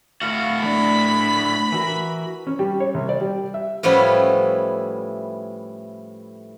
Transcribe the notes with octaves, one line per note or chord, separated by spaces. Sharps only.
A2 F#4 F5
A3 D4 B5
E3 F#4 A#4
C#4
G3
C#5
C2
D5
G3
E5
A2 F3 G3 B3 C#4 E4